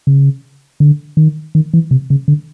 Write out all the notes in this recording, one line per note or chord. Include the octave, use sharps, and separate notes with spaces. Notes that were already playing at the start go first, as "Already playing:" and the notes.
C#3
D3
D#3
D#3
E3
C3
C#3
D3